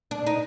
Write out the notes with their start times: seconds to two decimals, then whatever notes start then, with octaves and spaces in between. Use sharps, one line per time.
0.11 D4
0.27 D#4